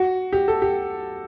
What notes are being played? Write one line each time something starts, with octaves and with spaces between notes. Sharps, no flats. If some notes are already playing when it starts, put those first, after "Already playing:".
Already playing: F#4
G4
A4
G4